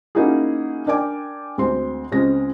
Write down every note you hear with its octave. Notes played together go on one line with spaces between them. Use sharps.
A#3 C#4 D#4 E4 F#4 G#4
D4 A#4 D5 G5 G#5 D6
D2 G#3 C4 C6
C#2 G#3 C4 C#4 A#6